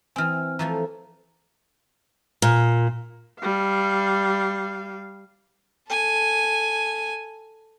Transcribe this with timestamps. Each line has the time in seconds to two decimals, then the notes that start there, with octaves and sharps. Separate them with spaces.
0.16 E3 C4 G#5 F6
0.59 E3 F3 A3 A#5
2.42 A#2
3.40 G3 F5
5.89 A4 G#5